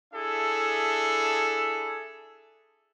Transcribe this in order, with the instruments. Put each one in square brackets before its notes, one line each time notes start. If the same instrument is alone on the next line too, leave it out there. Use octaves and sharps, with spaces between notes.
[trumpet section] D4 E4 G#4 A4 E5